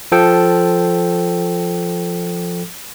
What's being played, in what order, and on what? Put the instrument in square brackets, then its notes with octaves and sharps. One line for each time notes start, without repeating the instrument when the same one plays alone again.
[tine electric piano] F3 A4 G5